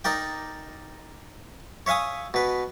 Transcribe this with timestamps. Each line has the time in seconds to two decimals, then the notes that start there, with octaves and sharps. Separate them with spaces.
0.05 D#4 A#4 D5 G5
1.86 C#5 E5 F5 G#5 D#6
2.34 B2 B4